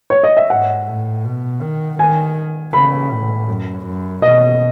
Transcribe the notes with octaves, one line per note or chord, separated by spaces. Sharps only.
C#5
D#5
E5
G#2 F#5
A2
B2
D#3
D#3 G#5
C#3 B5
A2
F#2
F#2
B2 D#5